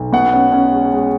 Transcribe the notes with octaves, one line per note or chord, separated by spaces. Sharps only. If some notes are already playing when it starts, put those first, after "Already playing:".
Already playing: B1
B2 F#5
C#4
C#4
G#3
G#3